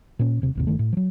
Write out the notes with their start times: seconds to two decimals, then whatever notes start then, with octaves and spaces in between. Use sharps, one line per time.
0.19 A#2 C#4
0.42 D#1 C3
0.55 G#1 D#2 C3
0.67 G1 D#3 A3
0.79 A2
0.93 F3 F#3